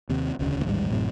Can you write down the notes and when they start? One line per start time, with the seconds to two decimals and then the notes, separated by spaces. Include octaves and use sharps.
0.09 D#2 C3
0.39 E1 D2 C#3
0.65 A1 D#2 G#2 G3
0.90 A1 F#2 A2 C3